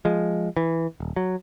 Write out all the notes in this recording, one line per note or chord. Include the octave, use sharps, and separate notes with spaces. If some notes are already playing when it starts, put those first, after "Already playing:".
F3 G#3
E3
D#1
F#3